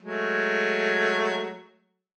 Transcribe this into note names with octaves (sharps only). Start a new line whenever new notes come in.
F#3 G#3 A3